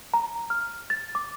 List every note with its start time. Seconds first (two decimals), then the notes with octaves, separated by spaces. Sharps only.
0.14 A#5
0.50 F6
0.90 A6
1.15 D6